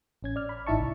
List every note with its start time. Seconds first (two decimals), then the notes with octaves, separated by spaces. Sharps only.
0.23 A1 C#4 G#6
0.36 D5 F6
0.49 B5
0.67 G#1 D#4 E4 E5 A5 C#6
0.80 B1